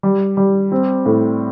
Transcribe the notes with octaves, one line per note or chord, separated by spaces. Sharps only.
G3
G3
C4
A2